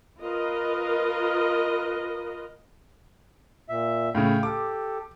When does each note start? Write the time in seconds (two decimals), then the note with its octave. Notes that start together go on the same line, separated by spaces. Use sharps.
0.21 F4 A#4 B4 D#5
3.69 A#2 E5
4.15 A2 C#3 F5 G5
4.43 G4 A4 D6